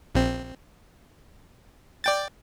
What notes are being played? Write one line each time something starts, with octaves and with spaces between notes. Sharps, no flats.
A#1 C4
D5 G5 A6